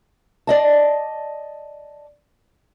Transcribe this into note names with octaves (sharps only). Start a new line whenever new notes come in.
D5 D#5 A5